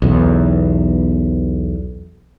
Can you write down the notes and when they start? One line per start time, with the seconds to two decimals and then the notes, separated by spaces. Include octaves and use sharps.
0.02 B1 E2